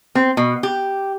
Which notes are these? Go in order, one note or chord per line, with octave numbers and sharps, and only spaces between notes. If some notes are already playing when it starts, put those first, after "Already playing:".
C4
B2
G4